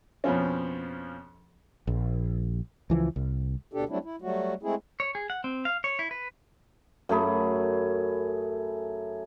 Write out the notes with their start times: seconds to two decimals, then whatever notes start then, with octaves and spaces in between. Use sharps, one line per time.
0.24 F2 B2 F3 C#4
1.87 A#1
2.90 C#2 E3 F3
3.16 C2
3.73 D2 B2 D4 G4 A4
3.89 F#3 G3 A3 C4 D4 E4
4.04 E4
4.22 F#3 G3 A3 F#4
4.63 G#3 A3 C4 E4 G#4
5.00 C#5
5.15 G#4
5.30 F#5
5.44 C4
5.65 F5
5.84 C#5
5.99 E4
6.11 B4
7.09 F#2 A3 G#4 B5